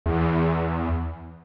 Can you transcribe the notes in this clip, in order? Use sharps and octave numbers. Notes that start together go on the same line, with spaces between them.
E2